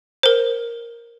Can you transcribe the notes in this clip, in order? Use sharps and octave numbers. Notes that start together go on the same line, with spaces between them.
A#4 C5